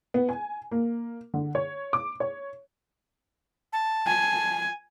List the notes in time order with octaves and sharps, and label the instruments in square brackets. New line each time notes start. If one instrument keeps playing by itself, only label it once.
[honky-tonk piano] B3
G#5
A#3
D3
C#5
D6
C#5
[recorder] A5
[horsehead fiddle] G#5